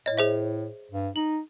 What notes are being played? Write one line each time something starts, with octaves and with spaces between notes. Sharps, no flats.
A2 C#5 D#5
G#4 C5 E5
G2
D#4 F#7